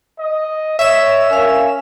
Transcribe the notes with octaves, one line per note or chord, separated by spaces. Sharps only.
D#5
C#5 E5 E7
C#4 A#4 F5